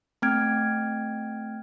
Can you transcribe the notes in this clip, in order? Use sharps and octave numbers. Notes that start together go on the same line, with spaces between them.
A3 C4 G5 F6 G#6 D7